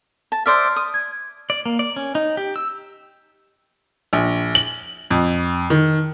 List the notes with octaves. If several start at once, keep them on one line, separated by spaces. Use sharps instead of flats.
A5
C5 D5 E5 C6 F6
D#6
G#6
D5
A#3
D5
C#4
D#4
G4
E6
A#1
F#7
F2
D#3